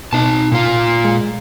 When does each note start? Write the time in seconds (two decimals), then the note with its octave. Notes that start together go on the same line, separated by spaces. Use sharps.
0.13 B2 D#4 A5
0.52 A#2 F4
1.05 G#3